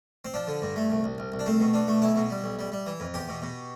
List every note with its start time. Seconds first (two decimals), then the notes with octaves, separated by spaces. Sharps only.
0.25 C4
0.34 F3 D4
0.47 D3
0.62 G2
0.76 A3
0.90 C2
1.04 C2
1.18 C2
1.32 C2
1.39 D4
1.46 A3 C4
1.60 B2
1.73 B2 D4
1.88 A3
2.02 B1 E4
2.16 B2
2.30 G3
2.44 B1
2.59 G3
2.72 G3
2.86 E3
3.00 F2
3.14 E2 G4
3.29 B2
3.42 B2